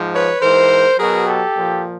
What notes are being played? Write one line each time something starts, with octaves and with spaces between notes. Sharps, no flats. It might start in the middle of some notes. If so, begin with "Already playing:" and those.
Already playing: G#2 F3
B4 C#5
G#2 E3 A#4 C5
B2 F#3 G#4 A#4
G4 A4
A#2 F3